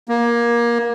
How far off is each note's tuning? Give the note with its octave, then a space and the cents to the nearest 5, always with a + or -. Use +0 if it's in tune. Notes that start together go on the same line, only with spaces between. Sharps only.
A#3 +20